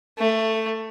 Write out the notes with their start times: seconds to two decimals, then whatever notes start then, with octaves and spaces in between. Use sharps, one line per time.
0.18 A3